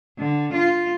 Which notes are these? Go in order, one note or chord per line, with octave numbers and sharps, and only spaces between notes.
D3
F4